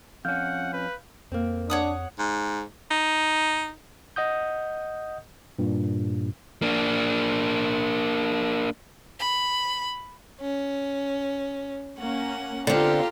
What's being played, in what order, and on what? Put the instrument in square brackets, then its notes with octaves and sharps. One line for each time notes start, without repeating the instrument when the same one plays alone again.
[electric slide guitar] F2 C#4 [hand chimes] F5 F6 G6 [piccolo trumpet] F#5
[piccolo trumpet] B4
[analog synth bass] F2 [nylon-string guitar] A#3 C4
[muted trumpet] D4 [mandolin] C#5 F#5 D#6
[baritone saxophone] G#2
D#4
[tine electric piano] D#5 F#5 D#6 G6
G2 A#2
[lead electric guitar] A#3 D4
[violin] B5
C#4
[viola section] A#3 C#4 [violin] F#5
[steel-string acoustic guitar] D3 C4 [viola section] F4 A4 F5 [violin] G4 A#5